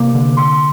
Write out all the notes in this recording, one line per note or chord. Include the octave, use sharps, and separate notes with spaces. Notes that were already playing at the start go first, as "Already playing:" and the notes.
Already playing: C3 A#3 D6
D3
D3 C6